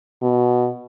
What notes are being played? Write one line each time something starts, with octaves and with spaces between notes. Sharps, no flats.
B2